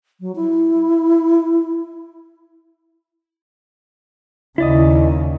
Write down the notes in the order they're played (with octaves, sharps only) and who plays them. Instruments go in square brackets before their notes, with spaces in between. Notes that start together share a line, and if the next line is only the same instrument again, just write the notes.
[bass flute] F#3
E4
[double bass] D#2 C#3 [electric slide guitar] E4 D5 D#5